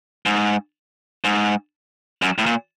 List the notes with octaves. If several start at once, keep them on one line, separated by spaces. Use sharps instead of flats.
G#2
G#2
F#2
A2
A#2